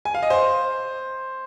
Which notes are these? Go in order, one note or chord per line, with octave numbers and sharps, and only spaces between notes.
G#5
F5
D#5
C5